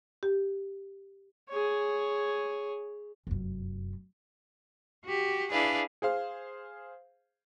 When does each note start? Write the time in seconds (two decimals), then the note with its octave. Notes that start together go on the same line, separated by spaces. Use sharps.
0.23 G4
1.49 G#4 C#5
3.27 F1 F#2
5.05 F#4 G4
5.50 D4 E4 G#4 B4 D5 F5
6.02 G#4 C5 F5